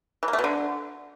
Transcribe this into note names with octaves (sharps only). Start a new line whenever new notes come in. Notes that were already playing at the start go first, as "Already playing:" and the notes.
E3
A#3
A3
B2
D3